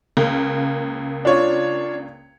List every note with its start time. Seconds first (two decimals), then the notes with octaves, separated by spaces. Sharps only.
0.17 C#2 C#3 A#3
1.25 D4 F4 C#5